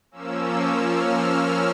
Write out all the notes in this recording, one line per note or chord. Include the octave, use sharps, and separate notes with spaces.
F3 A#3 C#4 E6
F6
F6
E6